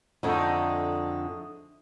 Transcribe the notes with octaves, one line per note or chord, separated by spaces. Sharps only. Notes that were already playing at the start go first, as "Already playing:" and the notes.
F2 D3 G#3 A3 D#4